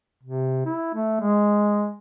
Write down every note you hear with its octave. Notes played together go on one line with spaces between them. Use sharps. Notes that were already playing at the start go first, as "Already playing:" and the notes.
C3
E4
A3
G#3